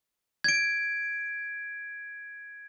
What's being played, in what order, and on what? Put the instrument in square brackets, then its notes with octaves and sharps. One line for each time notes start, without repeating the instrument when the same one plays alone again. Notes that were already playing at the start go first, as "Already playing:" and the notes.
[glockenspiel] G#6 D7